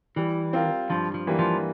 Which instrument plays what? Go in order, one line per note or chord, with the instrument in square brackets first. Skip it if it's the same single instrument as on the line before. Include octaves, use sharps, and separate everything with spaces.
[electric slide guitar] E3 [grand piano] G3
[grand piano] C4 F4 A#4
[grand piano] G2 [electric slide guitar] F3
[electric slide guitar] F3
[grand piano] E3 G3 A#3
[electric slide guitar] F3